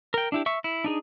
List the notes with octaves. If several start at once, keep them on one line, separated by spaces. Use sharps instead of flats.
A#4 G5
D4 E4 G4
E5 C#6
E4
D4 D#4 G#4